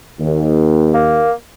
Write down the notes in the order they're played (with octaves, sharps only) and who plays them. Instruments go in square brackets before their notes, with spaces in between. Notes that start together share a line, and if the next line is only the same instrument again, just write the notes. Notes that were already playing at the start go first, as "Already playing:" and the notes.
[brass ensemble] D#2
[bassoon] A#3